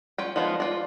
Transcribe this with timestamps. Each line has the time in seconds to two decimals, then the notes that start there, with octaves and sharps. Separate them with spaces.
0.18 C#4 F4 G5
0.36 F3 G#3 B3 F4
0.60 F4 D5